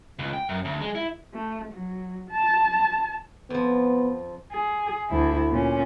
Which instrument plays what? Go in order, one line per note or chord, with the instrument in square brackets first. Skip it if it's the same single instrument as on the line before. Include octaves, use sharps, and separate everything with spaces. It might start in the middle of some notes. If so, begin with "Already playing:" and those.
[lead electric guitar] C#2
G5
F#2
D2
G#3
E4
[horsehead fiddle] A3
F#3
A5
[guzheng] F2 F3 [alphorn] B3
[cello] G#4
D2 E4
A#2 C#4